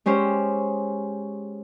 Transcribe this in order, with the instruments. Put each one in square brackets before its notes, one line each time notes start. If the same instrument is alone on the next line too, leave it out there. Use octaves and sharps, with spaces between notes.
[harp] G#3 C#4 G4 C5